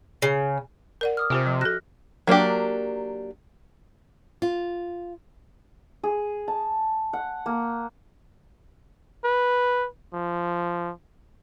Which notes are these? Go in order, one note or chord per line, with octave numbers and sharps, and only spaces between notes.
C#3
A#4 D5 F#5
D6 D#6 F6
C3 F4 G4 C5 E5 G#5 D6
F3
F#4 A4 F6 F#6 A#6
F#3 A#3 D4 G4
F4
G#4
A5
F#5
A#3
B4
F3